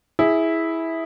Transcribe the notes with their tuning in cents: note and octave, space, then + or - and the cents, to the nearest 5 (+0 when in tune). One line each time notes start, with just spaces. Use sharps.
E4 -10 G#4 +0